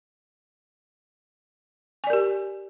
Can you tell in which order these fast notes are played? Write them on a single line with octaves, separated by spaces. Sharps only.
G#5 D5 A#4 G4